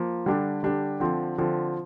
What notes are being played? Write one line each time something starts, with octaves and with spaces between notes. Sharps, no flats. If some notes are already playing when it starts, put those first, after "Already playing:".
Already playing: F3 A#3
D3 G3 D4 G4
D3 G3 D4 G4
D3 F3 C4
D3 F3 C4